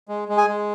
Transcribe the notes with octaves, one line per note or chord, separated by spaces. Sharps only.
G#3
G#3
G#4 G#5
G#3